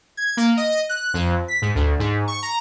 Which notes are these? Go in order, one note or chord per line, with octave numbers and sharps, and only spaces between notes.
G#6
A#3
D#5
F#6
F2
B6
G#2
D2
G#2
C#6
A#5